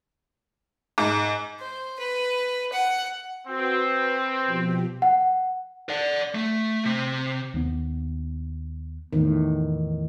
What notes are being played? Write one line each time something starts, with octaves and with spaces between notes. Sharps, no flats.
G#2
C5
B4
F#5
C4 F#4 B4
B4
B2 F3 G4
F#5
D5 F#5
A3
C3
D#2 B3
E2 A2 D#3